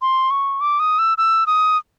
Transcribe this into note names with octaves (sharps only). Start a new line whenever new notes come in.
C6
C#6
D6
D#6
E6
E6
D#6